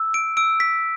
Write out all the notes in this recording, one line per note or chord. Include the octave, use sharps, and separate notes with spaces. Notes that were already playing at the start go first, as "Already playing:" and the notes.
Already playing: E6
D7
E6 D7
B6